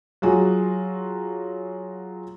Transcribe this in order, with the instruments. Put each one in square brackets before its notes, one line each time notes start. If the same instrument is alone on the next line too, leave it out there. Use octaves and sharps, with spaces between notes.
[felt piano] F#3 F4 F#4 G#4